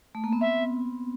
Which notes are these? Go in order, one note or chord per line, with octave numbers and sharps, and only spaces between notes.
A3
A#3
B3
C4 E5